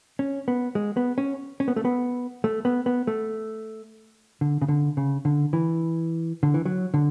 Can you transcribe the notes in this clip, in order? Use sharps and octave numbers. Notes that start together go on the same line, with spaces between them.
C#4
B3
G#3
B3
C#4
C#4
B3
A3
B3
A3
B3
B3
A3
D3
C#3
D3
C#3
D3
E3
D3
E3
F#3
D3